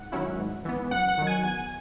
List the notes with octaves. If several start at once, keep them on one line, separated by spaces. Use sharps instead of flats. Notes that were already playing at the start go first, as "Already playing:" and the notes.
Already playing: G#2 F#5
D#3 F#3 C#4 E4
G#2
E3 B3
F#2 F#5
F#5
D#3 F#3
G#5
E2 G#5